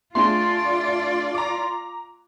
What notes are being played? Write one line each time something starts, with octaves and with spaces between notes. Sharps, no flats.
A3 D4 F4 G#4 D5 C6
A#5 D6